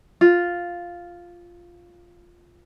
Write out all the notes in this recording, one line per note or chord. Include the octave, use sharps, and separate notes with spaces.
F4